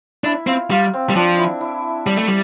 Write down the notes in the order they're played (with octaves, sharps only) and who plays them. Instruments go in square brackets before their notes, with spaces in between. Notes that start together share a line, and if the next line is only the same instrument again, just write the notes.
[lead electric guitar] D4 [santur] E4
[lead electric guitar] C4 [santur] F4
[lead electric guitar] G3 [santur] F4
[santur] C4
[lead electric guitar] G3
[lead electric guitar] F3 [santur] D4
[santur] E4
E4
[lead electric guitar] G3 [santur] D5
[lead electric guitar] A3
G3